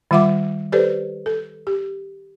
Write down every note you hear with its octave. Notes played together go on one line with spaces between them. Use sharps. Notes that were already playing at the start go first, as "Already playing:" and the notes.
D#3 G3 F4 E5 F#5 D6
G4 A4 B4 C5 D5
A4
G4